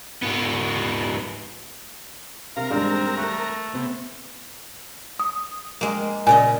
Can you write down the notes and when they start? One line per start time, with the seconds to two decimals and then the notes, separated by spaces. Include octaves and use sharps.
0.22 G#2 B3
2.56 C3 A#4 F5
2.71 G#2 G3 G#3 C4 D4
3.17 A3 F#6
3.74 C3 B3
5.19 D#6
5.81 G#3 A#3
6.27 A#2 C#3 D#5 G#5